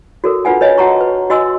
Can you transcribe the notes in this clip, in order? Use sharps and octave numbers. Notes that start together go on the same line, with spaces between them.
F#4 A4 A#4
D4 F4 B4 F#5 G#5
B4 C#5 D#5 G#5
F#4 F#5 A5 A#5 C#6
B4
F#4 D#5 G#5 C6 E6